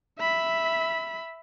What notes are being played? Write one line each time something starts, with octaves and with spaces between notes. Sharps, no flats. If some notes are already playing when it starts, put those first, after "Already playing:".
E5 B5